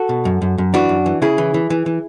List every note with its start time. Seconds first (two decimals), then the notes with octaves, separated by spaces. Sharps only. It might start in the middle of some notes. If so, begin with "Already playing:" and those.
Already playing: F#4 A4
0.09 B2
0.25 F#2
0.42 F#2
0.58 F#2
0.74 E3 D4 F#4
0.89 F#2
1.06 E3
1.22 C#3 E4 G#4
1.38 E3
1.54 E3
1.70 E3
1.86 E3